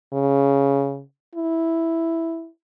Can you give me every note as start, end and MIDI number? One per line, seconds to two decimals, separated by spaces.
0.13 1.01 49
1.35 2.48 64